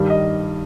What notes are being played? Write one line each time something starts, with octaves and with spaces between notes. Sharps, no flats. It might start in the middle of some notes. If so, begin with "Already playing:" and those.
Already playing: G2 D#3 G3
D#5